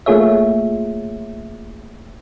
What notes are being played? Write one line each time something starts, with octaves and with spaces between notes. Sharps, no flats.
A3 A#3 F4 G#4 C#5 E5